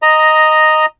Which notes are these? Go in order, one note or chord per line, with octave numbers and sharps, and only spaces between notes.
D#5 A#5